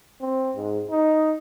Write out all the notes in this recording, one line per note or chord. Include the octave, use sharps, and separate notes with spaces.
C4
G#2
D#4